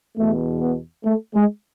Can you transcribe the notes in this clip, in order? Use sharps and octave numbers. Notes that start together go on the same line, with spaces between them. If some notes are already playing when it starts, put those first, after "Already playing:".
E2 B2 A3
B3
A3
G#3